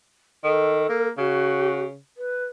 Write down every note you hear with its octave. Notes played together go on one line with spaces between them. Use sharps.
D#3 A4
A#3
C#3 F#4
B4